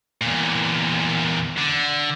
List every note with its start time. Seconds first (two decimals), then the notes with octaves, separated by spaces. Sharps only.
0.22 E2 A#2
1.57 D3